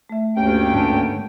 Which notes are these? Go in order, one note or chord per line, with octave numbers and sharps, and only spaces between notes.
A3 E5
D2 G2 A#3 C#4 G4 G5
G#2 D3 B3 A5